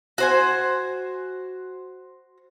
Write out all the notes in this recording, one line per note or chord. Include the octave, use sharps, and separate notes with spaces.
F#4 C5 G#5